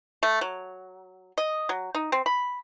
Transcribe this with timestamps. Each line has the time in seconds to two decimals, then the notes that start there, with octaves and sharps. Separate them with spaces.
0.23 A3
0.41 F#3
1.38 D#5
1.69 F#3
1.95 D#4
2.12 C4
2.26 B5